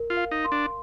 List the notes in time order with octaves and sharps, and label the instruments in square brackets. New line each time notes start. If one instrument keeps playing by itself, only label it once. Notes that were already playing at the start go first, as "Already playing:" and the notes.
Already playing: [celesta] A#4
[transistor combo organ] F4
[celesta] F5
[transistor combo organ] D#4
[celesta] C6
[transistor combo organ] D4